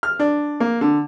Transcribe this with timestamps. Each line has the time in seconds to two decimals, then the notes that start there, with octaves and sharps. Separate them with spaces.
0.03 F6
0.20 D4
0.60 A#3
0.81 D3